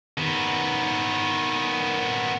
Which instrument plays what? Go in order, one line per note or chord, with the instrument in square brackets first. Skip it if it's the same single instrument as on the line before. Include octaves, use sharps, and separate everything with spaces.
[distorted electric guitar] D#3 B3